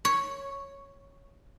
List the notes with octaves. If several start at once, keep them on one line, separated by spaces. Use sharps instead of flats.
C#5